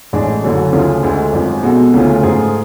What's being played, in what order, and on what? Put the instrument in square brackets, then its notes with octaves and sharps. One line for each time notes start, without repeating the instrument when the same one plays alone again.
[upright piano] A1 A2 G#3 D4
F#1 F#2 D3 F#3
D2 C#3 F3 A3 F4
D2 D3 G#3
G#1 F#2 F3 G#3
B2 G#3 B3 F#4 A4
D2 C#3 F3 A3 F4
G#2 F3 A3 F4 G#4